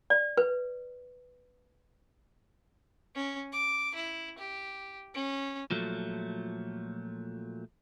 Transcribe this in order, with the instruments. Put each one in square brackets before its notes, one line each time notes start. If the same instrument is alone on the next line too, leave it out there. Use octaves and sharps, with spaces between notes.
[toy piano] D5
B4
[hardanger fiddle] C#4
D6
E4
G4
C#4
[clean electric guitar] A#2 F3 F#3 A3